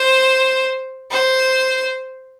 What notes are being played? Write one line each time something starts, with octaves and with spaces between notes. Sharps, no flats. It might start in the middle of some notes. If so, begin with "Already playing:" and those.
Already playing: C5
C5